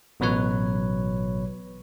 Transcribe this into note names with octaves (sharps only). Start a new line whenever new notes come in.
A1 B2 F#3 B4 C#5